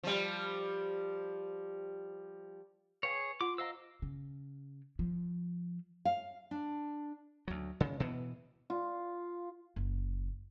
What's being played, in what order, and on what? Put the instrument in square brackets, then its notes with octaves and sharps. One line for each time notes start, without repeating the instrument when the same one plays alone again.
[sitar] F3 G3
[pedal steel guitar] G#4 C#5 [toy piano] B4 F5 G5
[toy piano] F4 F#5 C6 [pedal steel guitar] D6
[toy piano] C5 F#5 A#5 [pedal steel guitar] D#5 F5 E6
[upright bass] C#3
F3
[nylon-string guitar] F5
D4
[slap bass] D2 F#3
C#3
B2 E3 B3
[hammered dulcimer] F4
[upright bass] F#1